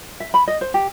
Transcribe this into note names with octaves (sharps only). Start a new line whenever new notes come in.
E5
B5
D#5
C5
G4